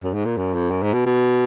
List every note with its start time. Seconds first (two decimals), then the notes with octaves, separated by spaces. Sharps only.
0.03 F#2
0.14 G#2
0.25 A#2
0.38 F#2
0.54 F2
0.71 F#2
0.83 G#2
0.94 B2
1.06 B2